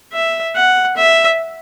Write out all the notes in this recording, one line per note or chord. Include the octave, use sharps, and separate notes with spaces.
E5
F#5
E5